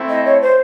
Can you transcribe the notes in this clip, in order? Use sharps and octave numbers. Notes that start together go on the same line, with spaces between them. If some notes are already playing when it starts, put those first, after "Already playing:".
Already playing: A3 C4 E4
D#5
C#5
C5